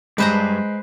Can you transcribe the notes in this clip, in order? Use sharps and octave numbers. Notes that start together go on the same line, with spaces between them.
G2 G#3 B4 C5 A#5